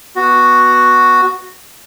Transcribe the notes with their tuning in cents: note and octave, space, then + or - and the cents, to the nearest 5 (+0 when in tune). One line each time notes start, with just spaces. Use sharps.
B3 +0 F#4 +0